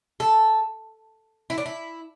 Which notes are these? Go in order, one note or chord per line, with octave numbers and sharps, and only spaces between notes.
A4
E4
D4
E4